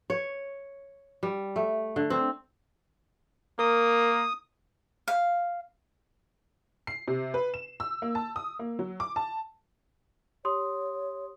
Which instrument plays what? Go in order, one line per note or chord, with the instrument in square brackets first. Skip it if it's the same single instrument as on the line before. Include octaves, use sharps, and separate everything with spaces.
[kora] C#5
G3
A3
D3
C4
[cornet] A#3 [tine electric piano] A#4 [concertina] D#6
[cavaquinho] F5
[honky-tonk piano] C7
C3
B4
E7
E6
A#3
A5
D#6
A#3
F#3
D6
A5
[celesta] G4 C6 D#6 [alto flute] C#5